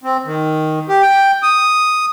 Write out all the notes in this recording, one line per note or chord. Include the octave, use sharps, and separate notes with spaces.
C4
D#3
G4
G5
D#6